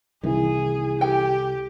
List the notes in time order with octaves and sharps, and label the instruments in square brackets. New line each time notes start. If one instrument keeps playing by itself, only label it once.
[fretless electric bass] C2 [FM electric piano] D#3 E3 E4 [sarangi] G#4
[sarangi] G4 [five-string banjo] A4 G5 G#5